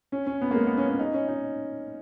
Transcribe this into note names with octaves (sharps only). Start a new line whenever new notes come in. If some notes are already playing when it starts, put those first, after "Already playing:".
C#4
C#4
B3
A#3
G#3
B3
C#4
C#4
D#4
C#4
D#4